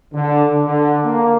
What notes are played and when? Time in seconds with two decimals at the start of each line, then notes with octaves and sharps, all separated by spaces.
0.13 D3
0.65 D3
1.04 A#3